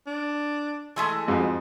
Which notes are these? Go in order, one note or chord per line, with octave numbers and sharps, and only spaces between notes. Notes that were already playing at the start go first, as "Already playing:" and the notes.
D4
E3 G#3 A3
F2 G#2 F#4